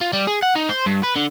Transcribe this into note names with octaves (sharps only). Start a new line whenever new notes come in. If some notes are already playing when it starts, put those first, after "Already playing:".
F4
G3
G#4
F#5
D#4
C5
G2
B4
D3